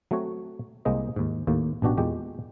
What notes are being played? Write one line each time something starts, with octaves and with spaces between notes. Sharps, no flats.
F#3 A3 C4 F#4 C#5
C2 G#3 A#3 C5 D#5
D#2 G#2
D#2 A2 A#3
A1 B2 D4 F#4 G4
E2 A#2 G#3 G4